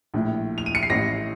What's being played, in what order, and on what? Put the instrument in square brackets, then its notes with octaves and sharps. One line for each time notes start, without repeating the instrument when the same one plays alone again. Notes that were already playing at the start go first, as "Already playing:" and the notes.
[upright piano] A#1 A2
F7
D#7
C#7
C7
A1 A2 A#6